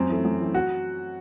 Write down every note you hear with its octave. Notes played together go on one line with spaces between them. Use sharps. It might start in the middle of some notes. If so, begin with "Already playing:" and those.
Already playing: F#2 C4
E3 A3
F#2
E3 A3
F#4